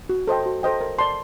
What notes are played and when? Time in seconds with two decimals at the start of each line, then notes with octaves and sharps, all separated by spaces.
0.09 F#4
0.27 A4 C5 D#5 G5
0.46 F#4
0.63 A4 C5 D#5 G5
0.81 A#4
0.99 D5 A5 C6